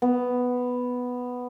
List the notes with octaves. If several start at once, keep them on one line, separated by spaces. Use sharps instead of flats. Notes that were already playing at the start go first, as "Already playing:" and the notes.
B3